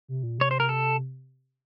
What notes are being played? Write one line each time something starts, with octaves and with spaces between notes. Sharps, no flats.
C3
A#2
C3 C#5
C5
A#4
A4